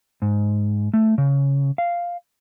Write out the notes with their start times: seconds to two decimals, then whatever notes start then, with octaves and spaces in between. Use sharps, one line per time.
0.22 G#2
0.94 A3
1.18 C#3
1.78 F5